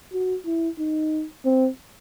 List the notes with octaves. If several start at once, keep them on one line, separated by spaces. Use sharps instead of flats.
F#4
E4
D#4
C4